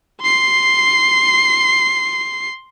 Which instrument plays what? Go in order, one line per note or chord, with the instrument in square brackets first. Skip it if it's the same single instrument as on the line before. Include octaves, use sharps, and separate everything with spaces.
[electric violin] C6 C7